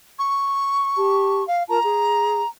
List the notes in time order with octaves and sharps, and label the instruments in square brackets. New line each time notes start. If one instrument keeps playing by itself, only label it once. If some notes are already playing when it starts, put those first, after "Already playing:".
[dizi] C#6
[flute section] G4 A5
[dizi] F5
[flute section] F4 A#4 A5 [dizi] A#5
[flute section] G#4